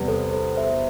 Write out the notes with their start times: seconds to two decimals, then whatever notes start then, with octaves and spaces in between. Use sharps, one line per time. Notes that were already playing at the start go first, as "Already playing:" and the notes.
Already playing: E2 C3 G3 B3
0.08 A4 C5
0.33 A4 C5
0.57 C5 E5